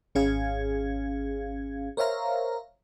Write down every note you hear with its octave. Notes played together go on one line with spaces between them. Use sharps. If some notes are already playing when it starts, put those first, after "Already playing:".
G#1 C#4 G#4 F5 G#6
A#4 C5 C#5 E5 F5 A#5